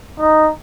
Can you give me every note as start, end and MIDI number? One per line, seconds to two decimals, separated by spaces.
0.20 0.50 63